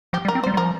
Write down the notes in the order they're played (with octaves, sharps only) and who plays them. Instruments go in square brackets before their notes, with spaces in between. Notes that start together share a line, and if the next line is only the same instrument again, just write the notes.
[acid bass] F3 [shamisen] G4
[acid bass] G3
[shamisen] A#4
[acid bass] C4
[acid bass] G3 [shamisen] C5
[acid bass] G3
[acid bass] F3 [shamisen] A#4